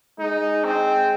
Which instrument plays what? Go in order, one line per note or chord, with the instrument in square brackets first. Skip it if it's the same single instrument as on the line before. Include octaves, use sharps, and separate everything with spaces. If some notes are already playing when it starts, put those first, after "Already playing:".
[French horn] G#3 [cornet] D#4
[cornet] C4